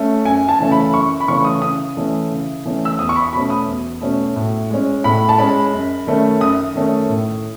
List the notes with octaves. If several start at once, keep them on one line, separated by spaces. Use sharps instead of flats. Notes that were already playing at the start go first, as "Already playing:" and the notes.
Already playing: A3 C#4
F#2 G#5
A5
C#3 E3 A3 C#4
B5
F#2 C#6
B5
C#3 E3 A3 C#4 C#6
D#6
C#3 D#6
E3 A3 C#4
C#3
E3 A3 C#4
E6
E2 D#6
C#6
B5
B2 A3 C#4 B5
D#6
E2
B2 A3 C#4
A2
G#3 C#4
A2 B5
A5
G#3 C#4 B5
F#2
D#3 A3 C#4
F#2 D#6
D#3 A3 C#4
A2